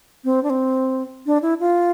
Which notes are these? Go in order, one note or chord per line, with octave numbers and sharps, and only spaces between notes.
C4
D4
C4
D4
E4
F4